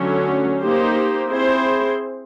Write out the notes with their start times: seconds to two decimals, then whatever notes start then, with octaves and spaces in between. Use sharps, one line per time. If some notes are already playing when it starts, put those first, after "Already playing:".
Already playing: D3 F#3 A3 C#4
0.60 A#3 D#4 G4 C5
1.29 C4 E4 G#4 C5